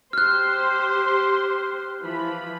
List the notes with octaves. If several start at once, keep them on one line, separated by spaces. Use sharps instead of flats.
G4 C5 C6 F6 F#6
E3 F3 B5